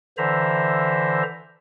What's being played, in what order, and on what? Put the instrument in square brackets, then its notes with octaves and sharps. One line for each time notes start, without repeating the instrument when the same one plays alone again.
[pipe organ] D3 E3 C5 E5 A#5